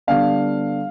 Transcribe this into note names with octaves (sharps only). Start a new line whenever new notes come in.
D3 G3 B3 D4 F5